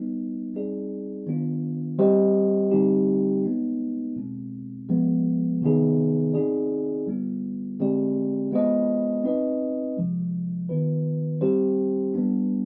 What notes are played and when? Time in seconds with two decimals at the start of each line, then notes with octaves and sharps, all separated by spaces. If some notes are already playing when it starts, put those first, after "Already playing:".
Already playing: G3 B3 D#4
0.54 G3 C4 D#4 G#4 D5
1.27 D#3 B3 D4 F4
1.98 G3 C4 G4 C5 D#5
2.71 D3 G3 C4 D#4 G4
3.44 G#3 B3 D#4
4.16 B2 G#3 C4
4.89 F3 G#3 B3
5.61 C3 D#3 B3 D#4 G#4
6.34 C4 D#4 G#4 D5
7.06 D3 G3 B3 F4
7.80 D3 G#3 C4 G4 D5
8.52 G#3 B3 F4 C5 D#5
9.23 C4 D#4 B4 D#5
9.97 C3 F3 G#3
10.69 D#3 B3 F4 B4
11.41 G3 C4 G4 C5
12.14 G3 B3 D4